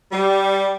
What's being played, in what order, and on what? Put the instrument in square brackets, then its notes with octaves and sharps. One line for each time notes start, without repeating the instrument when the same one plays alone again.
[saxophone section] G3